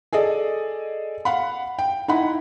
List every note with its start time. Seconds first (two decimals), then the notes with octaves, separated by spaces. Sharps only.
0.13 G#4 A4 D5 D#5
1.25 F5 F#5 B5
1.79 G5
2.08 D#4 E4 F#5 B5